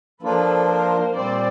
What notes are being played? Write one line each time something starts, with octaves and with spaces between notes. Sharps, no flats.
F3 A#3 D4 F4 A4 B4
A#4 C5
A#2 G3 C4 C5 D5